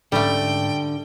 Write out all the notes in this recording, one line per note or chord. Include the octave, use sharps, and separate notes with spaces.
G#2 D3 G3 A3 C#4 G5